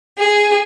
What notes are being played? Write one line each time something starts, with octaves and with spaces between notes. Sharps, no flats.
G#4